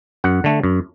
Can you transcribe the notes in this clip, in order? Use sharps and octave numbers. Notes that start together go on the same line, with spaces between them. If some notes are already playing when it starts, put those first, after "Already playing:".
F#2 F#5
D3 A3
F#2